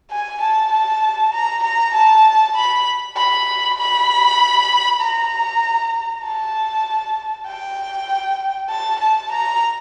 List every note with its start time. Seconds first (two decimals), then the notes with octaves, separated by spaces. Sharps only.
0.11 G#5
0.41 A5
0.72 A5
1.33 A#5
1.64 A#5
1.94 A5
2.56 B5
3.17 B5
3.79 B5
5.01 A#5
6.24 A5
7.47 G5
8.70 A5
9.00 A5
9.32 A#5